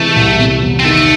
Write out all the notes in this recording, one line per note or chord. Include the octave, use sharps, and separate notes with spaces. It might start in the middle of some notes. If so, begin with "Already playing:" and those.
Already playing: C3 E3 G#3 A3
C2
C3
E2
C4
D#3 A3